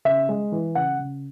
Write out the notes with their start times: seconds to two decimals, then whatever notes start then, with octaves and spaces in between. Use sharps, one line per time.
0.05 C#3 E5
0.29 G#3
0.52 E3
0.75 C#3 F#5
0.99 C#3